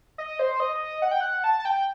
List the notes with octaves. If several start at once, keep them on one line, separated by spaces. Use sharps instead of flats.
D#5
C5
D#5
F#5
G5
F#5
A5
A5
G5